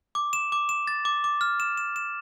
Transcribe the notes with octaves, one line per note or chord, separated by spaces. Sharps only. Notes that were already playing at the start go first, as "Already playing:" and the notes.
D6
E7
D6
E7
A6
D6
D6
F6
E7
E7
E7